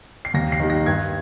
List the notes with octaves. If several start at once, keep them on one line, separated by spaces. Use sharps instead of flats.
C7
D#2 A#6
C7
D#3 G3
A#6
G2 G#6